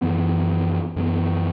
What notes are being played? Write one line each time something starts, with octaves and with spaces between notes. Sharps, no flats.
F#2 E3 B3
F#2 E3 B3